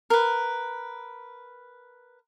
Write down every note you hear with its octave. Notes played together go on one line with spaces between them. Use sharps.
A#4 B4